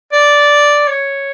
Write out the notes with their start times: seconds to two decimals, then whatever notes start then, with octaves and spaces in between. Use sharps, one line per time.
0.12 D5
0.88 C#5